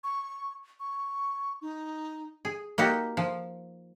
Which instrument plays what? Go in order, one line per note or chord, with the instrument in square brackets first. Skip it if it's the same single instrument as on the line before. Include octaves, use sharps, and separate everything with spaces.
[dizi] C#6
C#6
D#4
[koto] G#4
A#3 D#4 F#4 G4
F3